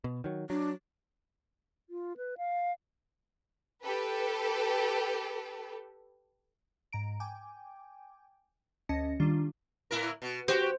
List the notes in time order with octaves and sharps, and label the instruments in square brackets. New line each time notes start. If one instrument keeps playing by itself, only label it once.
[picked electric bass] B2
D#3 F#3
[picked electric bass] F#3 [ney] D4
[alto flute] F4
B4
F5
[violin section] G4 A4 B4
[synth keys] G#2 A#5 D7
G5 G#5 D6
D2 C#4 D#5 A5 A#6 C#7
D#3 G3 D4 F4
[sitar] A2 E4 A#4
B2
[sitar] F#4 G4 [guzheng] C5